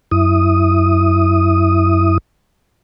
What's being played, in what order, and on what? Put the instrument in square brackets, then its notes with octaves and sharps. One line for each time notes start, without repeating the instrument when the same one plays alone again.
[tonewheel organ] F#2 E4 D#6